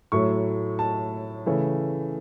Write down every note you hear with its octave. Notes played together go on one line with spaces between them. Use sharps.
A2 F#3 A3 C#6
A5
C#3 E3 A3